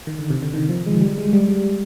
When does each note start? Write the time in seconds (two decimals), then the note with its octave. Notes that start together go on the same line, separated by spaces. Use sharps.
0.07 D#3
0.19 D3
0.30 C3
0.43 D3
0.54 D#3
0.69 F3
0.86 G#3
1.01 G3
1.18 G#3
1.33 G3
1.48 G3